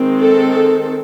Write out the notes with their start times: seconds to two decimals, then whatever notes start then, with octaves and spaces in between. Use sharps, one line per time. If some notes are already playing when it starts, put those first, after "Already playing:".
Already playing: D#3 G#3 C4
0.22 A4